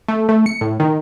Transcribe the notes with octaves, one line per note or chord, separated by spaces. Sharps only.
A3
A3
C#7
A2
D#3